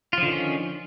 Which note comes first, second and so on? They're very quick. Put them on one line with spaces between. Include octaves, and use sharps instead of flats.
F4 F3 D3 D#3 C#4